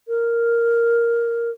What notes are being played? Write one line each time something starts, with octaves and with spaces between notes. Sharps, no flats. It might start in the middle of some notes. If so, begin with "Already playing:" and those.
A#4